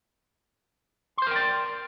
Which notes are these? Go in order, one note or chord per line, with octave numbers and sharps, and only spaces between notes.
A#4 C5 D5 G5 C6